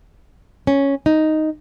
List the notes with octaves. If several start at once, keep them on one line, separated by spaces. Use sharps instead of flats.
C#4
D#4